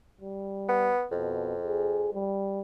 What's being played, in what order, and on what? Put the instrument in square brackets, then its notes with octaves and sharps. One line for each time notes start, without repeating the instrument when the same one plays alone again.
[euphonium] G3
[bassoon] B3
[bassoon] F2 [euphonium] B2
[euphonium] G#4
G3